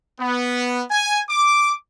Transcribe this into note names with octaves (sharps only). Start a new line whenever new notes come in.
B3
G#5
D6